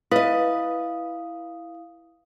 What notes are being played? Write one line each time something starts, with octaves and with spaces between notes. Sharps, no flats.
E4 B4 D#5 F5 D#6